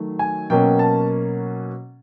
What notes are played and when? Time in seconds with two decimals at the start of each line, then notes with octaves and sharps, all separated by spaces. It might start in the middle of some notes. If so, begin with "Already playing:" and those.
Already playing: D#3 F#3 A3
0.19 G#5
0.50 B2 F#3 A#3 C#4 G5
0.79 A5